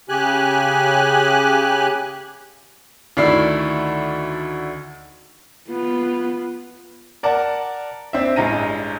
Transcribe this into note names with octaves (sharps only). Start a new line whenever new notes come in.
C#3 G4 G#5 F#6
D2 D#3 A3 E4 D5 C7
B3 F4
A#4 D5 F#5 A5
C4 D4 E5
A1 G2 G#3 A#5 A#6 D#7